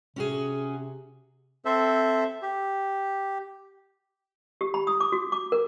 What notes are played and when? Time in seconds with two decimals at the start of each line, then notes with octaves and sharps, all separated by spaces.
0.16 C3 C#4 F#4 G#4
1.65 C4 A4 C5 E5
2.42 G4
4.61 G4
4.74 B5
4.87 D#6
5.00 D6
5.12 F#4
5.32 D6
5.52 A#4